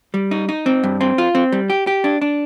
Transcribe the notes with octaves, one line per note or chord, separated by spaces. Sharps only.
G3
D#4
D#4
C4
G2
C4
F4
C4
G3
G4
G4
D4
D4